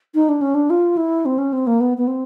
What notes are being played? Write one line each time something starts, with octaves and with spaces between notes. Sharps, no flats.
D#4
D4
C#4
D4
F4
E4
C4
C#4
C4
A#3
B3
B3
C4